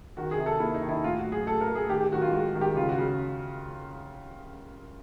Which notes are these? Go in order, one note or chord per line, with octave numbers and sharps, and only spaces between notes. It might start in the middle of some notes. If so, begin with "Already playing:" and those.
D#3 F#4
G#4
C3
A4
A#3 E4
D#4
D#3
E4
A2 F4
F#4
F#3
G#4
A2 A4
A#4
A2
G#4
D#3 G4
G4
D#3 F#4
F4
G#3 F#4
D#3
G4
C#3 F4
F#4
C#3